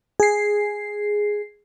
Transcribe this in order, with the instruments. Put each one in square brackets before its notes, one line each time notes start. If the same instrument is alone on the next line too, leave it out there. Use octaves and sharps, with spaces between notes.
[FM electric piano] G#4 C7